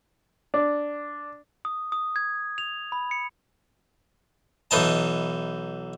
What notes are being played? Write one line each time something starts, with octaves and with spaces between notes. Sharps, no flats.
D4
D#6
D#6
G#6
F7
B5
C#7
B1 E3 D#4 A5